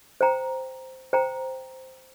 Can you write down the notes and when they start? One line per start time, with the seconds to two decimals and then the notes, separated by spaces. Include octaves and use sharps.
0.21 C5 G5 A#5
1.13 C5 G5 A#5